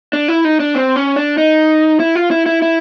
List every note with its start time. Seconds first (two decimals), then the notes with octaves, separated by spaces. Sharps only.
0.13 D4
0.28 E4
0.45 D#4
0.60 D4
0.75 C4
0.96 C#4
1.16 D4
1.38 D#4
2.00 E4
2.15 F4
2.31 E4
2.46 E4
2.62 E4